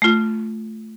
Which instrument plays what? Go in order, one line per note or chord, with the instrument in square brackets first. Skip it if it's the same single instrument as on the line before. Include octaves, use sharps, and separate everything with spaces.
[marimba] A3 F4